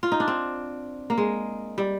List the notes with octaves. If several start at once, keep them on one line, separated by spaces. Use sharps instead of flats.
F4
D#4
D4
C4
A#3
G#3
G3